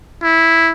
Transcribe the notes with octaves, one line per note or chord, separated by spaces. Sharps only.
E4